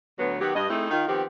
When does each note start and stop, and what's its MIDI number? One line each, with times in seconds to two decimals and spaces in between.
0.19 0.37 38
0.19 0.37 54
0.19 0.37 59
0.40 0.54 51
0.40 0.54 54
0.40 0.54 59
0.40 0.54 67
0.55 0.68 43
0.55 0.68 75
0.70 0.90 57
0.70 0.90 60
0.70 0.90 63
0.70 0.90 64
0.70 0.90 68
0.70 0.90 69
0.90 1.07 51
0.90 1.07 65
1.07 1.23 51
1.07 1.23 53
1.07 1.23 59
1.07 1.23 60
1.07 1.23 67